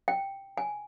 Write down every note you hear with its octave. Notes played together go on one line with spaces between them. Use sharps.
G5
G#5